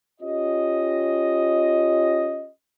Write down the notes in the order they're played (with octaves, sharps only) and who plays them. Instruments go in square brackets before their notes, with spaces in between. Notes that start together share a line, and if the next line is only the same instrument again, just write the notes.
[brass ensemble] C#4 F4 G4 D#5